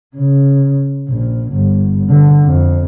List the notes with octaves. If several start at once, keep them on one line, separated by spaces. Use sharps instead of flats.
C#3
A#1
G1
D3
F2